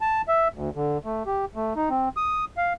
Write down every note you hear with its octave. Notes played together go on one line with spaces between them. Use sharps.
A5
E5
D2
D3
A3
G4
A3
D#4
C4
D#6
F5